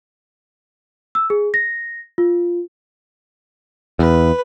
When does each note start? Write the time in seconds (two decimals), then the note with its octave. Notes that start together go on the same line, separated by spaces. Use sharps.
1.15 E6
1.30 G#4
1.54 A#6
2.18 F4
3.99 E2 B4